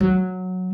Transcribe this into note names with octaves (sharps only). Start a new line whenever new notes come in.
F#3